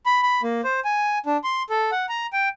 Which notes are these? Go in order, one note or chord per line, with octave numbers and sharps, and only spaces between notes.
B5
B5
A#3
C5
G#5
D4
C6
A4
F#5
A#5
G5